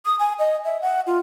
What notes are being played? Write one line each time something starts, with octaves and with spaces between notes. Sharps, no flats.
D#6
G#5
D#5
E5
F#5
F4